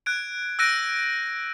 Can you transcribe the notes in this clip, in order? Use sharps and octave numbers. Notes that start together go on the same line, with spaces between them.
F#6 G#6 D7
E6 F#6 G6 A#6 D7 D#7